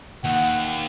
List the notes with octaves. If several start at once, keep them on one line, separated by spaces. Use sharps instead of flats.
D#2 F#5